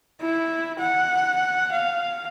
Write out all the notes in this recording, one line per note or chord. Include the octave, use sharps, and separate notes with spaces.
E4
F#5
F5